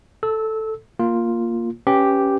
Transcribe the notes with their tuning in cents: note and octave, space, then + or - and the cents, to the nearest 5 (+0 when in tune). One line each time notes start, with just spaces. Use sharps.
A4 +0 E6 -20
A#3 +0 F4 +0
C#4 +0 G4 +0 B4 +0